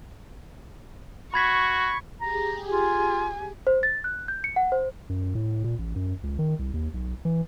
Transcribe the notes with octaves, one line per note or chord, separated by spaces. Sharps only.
F#4 B5 C#6 G#6 B6
G4 G#4 A#5
F4 G#5
C5
A6
F#6
G6
C#7
F#5
C5
F#2
A2
A#2
A1
F#2
C#2
D#3
C2
D#2
B1
E3